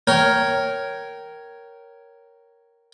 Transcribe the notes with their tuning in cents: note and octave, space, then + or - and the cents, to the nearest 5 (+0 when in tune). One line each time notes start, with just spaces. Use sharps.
A#4 +0 C#5 +0 G5 -20